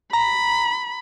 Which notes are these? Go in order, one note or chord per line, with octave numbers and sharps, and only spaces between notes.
A#5 B5